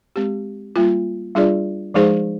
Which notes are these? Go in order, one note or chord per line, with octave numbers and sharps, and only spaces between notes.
G#3 C4 G4
G3 A#3 F4
G3 D4 F4 G#4 D5
F3 G#3 D#4 G#4 C5